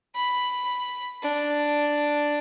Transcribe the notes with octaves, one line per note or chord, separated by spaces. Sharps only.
B5
D4